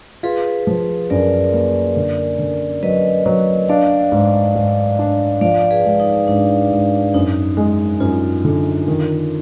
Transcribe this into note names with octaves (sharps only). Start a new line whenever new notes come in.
F4 G#4 B4
F3
F#2 A#4 D5
A#3
D3
D3
F#3 B4 D#5
F#3
D4 D5 F5
G#2
G#2
D4
F3 D5 F5
G#4 B4
G#3
D#4
G#2 D4
G#2
F#2 D#4
G#3
F#2 F4
D3
D#3